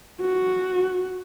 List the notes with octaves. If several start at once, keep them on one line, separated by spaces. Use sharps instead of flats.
F#4